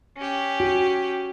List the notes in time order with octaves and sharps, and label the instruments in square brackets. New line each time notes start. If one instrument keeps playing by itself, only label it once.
[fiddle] C#4 G4
[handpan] F#4